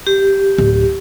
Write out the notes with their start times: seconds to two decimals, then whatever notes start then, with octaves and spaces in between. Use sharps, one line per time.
0.07 G4
0.58 D1